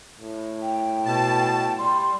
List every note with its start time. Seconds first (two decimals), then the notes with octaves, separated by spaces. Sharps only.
0.21 A2
0.61 G5
1.06 B2 A5
1.78 G3 C6